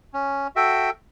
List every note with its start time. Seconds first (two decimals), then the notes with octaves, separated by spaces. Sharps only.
0.14 C#4
0.56 F#4 A4 E5 G5